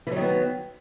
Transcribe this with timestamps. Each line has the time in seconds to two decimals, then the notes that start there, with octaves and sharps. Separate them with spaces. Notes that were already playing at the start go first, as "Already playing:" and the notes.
0.07 E3
0.11 F#3
0.16 D#3
0.21 B3